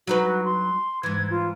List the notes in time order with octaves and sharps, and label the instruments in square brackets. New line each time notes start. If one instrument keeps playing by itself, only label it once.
[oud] F#3 D#4 B4 [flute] F#4
[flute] C6
[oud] G#2 E3 [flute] G#6
[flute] F4